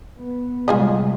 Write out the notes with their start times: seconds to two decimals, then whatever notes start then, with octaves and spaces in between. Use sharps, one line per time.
0.17 B3
0.68 C3 G3 G#3 F4 G#4 D#5